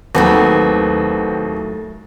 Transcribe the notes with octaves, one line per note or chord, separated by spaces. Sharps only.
D#2 A2 F#3 A3 C4 F#4 B4